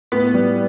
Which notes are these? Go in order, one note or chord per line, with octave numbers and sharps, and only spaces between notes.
A2 B3
G3